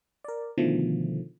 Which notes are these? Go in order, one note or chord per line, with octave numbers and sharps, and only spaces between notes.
A#4 D5
B2 D3 D#3 F3 A3